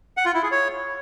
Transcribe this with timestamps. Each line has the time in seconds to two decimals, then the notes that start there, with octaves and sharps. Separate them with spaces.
0.17 F#5
0.26 F4
0.34 E4
0.43 G#4
0.51 C#5